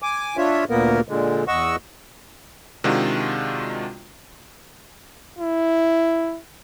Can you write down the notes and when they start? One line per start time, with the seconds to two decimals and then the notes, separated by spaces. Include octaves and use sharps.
0.02 G#5 D6
0.37 D4 F4 C#5 E5
0.70 D2 A#2 A#3 B3 A#4
1.09 A#2 D3 G#3
1.48 E2 D#5 F#5 C#6 E6
2.84 C3 D#3 G#3 D4 F4 F#4
5.39 E4